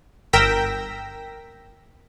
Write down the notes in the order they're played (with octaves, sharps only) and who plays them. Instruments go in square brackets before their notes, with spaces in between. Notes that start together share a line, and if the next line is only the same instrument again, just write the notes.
[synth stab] G1 A#4 G5 E6 A#6 B6